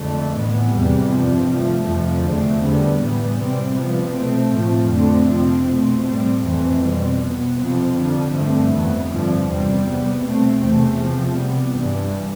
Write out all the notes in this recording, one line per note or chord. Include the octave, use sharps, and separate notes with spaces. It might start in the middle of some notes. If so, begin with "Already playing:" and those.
Already playing: F2 D3 A3
A2 E3 B3
E2 C3 E3 G3
G2 F3 C4
C3 F3 A3
F2 C3 F3
E2 D3 A3 C4
E2 D3 G3 B3
A2 E3 G3 B3
C3 G3 C4
C3 F3 B3
B2 A3 C4
A2 F3 A3 C4
F2 D3 A3 C4
C3 F3 C4
B2 A3 C4
A2 G3 C4
F2 E3 A3 C4
B2 G3 C4
B2 B3
F2 C3 F3 C4
F2 D3 F3
G2 D3 A3 C4
F2 E3 B3
G2 D3 F3 C4
E2 C3 G3 C4
C3 G3 B3
B2 A3 C4
E2 C3 E3 A3 C4
C3 F3 C4
C3 G3 B3
G2 E3 G3